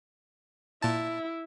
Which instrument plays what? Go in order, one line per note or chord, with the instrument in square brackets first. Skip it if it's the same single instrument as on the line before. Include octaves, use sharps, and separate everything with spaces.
[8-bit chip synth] A#2 A5 [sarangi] E4